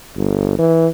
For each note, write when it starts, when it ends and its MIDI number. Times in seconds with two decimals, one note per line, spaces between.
0.17 0.56 31
0.59 0.88 52